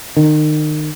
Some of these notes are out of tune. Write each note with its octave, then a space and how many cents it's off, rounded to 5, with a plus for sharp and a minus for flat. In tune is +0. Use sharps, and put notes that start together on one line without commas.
D#3 -30